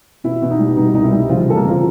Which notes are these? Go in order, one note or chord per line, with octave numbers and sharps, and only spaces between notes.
B2 E4
B2
D#4
G3
B2 D#4
C2 D#4
E4
G3
C#3 F3 F4
C#3 A4
A#3 A#4
F2 F3 F4